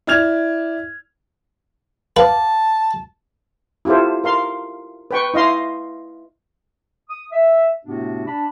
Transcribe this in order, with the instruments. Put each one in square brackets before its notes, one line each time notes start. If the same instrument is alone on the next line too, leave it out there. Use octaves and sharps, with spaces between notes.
[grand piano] E4 D5 F6 G#6 F7
[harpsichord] B4 [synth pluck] F5 F#5 D6 [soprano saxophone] A5
[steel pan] E4 F4 G4 A4 C5
A#4 F5 C6
B4 G5 C#6
E4 D#5 F5 C6
[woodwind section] D#6
E5
A2 C3 A3 B3 D4 F#4
D4 A5 B5